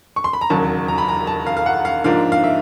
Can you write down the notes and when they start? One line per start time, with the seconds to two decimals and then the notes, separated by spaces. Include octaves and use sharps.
0.16 C#6
0.24 C6
0.33 B5
0.41 A#5
0.50 E1 D#2 C#3 F#3 A5
0.88 A#5
0.98 B5
1.08 A#5
1.27 A5
1.47 F5
1.57 F5
1.66 F#5
1.85 F5
2.04 G#2 F3 A#3 D4 F5
2.32 F5
2.44 E5